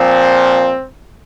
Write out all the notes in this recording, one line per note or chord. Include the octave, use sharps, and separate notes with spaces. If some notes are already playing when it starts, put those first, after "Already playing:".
Already playing: A#2 F3 C4